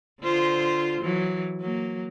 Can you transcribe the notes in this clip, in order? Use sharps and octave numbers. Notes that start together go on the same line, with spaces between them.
D3 F4 C5
E3 F#3
F#3 A#3